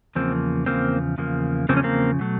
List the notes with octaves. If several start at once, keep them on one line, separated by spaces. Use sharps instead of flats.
E2 C#3 F3 A#3 C4
E2 C#3 F3 A#3 C4
E2 C#3 F3 A#3
E2 C#3 F3 A#3 C4
C#4
A#3 C4
B2 F#3 A3